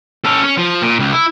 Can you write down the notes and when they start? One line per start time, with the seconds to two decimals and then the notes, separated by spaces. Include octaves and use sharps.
0.24 C#4 A4
0.44 C#4
0.57 F3
0.82 A#2
0.99 C#2
1.12 E4